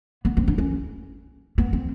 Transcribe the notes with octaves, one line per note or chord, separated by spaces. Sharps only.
B3
C4
D4
C#4
B3
C4